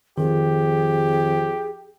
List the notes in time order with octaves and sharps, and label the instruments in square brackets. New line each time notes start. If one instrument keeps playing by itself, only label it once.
[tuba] F2 [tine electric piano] D#3 [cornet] G4 [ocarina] G#4